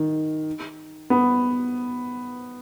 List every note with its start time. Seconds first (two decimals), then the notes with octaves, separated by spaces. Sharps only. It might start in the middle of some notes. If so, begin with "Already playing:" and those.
Already playing: D#3
1.10 B3